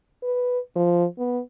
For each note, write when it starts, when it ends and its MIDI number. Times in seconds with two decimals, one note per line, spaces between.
0.23 0.59 71
0.76 1.05 53
1.19 1.40 59